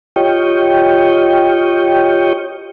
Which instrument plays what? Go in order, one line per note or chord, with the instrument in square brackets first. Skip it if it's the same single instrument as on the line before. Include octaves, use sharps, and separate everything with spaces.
[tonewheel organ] F4 G4 C#5 D#5 G5